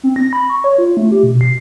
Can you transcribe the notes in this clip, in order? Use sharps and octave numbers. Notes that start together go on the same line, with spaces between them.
C4
A#6
B5
C#6
C#5
F4
A3
G4
B2
C7